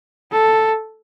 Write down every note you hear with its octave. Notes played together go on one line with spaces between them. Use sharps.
A4